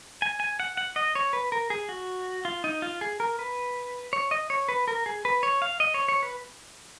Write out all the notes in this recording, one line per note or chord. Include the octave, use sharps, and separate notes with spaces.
G#5
G#5
F#5
F#5
D#5
C#5
B4
A#4
G#4
F#4
F4
D#4
F4
G#4
A#4
B4
C#5
D#5
C#5
B4
A#4
G#4
B4
C#5
F5
D#5
C#5
C#5
B4